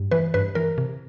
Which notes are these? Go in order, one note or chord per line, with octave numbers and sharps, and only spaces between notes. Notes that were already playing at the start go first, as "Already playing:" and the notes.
Already playing: G2
E3 B4
G2 B4
E3 A#4
C3